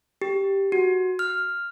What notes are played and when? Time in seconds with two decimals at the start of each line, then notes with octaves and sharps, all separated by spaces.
0.22 G4
0.72 F#4
1.19 F6